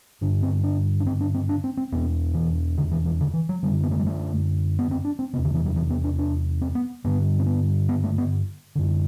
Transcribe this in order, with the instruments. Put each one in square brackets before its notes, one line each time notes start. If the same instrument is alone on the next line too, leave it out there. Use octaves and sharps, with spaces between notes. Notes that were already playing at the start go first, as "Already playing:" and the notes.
[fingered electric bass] G2 D3 D4
C4
D4
D4
C4
D4
C4
D4
C4
C4
E2 B2 B3
E3
D3
E3
E3
D3
E3
F#3
D3 G3
F#2
B3
A3
G3
A3
B3
C4
D4
C4
C3 B3
E2
D3
E3
F#3
E3
B3
D4
D4
C4
B3
G2 D3 B3
C4
B3
B3
A3
B3
F#2 D3